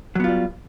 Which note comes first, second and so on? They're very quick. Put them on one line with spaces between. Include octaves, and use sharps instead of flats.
F#3 B3 F4 G3